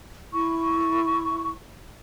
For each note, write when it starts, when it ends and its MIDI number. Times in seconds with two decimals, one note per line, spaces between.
0.33 1.50 64
0.33 1.50 85